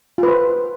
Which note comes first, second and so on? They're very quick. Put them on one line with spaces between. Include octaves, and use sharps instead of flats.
F4 B4 C5